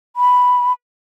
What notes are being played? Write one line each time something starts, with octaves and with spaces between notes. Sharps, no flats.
B5